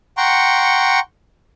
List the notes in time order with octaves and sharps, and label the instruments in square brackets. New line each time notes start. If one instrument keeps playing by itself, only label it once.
[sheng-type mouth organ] F#5 G5 A#5 C6 C#6